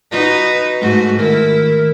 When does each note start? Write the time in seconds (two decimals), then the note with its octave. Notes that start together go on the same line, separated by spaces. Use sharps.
0.11 D#4 F#4 B4
0.81 G#2 A3 F#4
1.19 D#3 E4 A#4